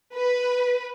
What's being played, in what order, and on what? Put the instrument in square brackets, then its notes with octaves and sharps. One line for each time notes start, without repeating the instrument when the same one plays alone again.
[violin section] B4